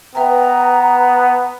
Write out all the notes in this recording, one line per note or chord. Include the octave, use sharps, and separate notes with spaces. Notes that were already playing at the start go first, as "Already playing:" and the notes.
B3 B4 E5 G5 A#5